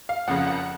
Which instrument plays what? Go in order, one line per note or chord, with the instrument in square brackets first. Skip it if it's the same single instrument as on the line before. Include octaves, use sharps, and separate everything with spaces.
[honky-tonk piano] F5
F#1 F2 C#3 F3 F#5
F#5